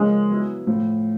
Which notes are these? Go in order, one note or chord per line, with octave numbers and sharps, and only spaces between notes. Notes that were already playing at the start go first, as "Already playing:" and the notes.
Already playing: C#3 F3 G#3 A#3 C#4
F#3 B3 E4
A2 F3 A3